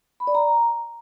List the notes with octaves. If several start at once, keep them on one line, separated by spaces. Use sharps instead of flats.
B5
D5
A#5